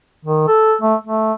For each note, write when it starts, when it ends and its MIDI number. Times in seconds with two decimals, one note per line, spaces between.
0.25 0.44 51
0.48 0.75 69
0.81 0.95 57
1.04 1.33 57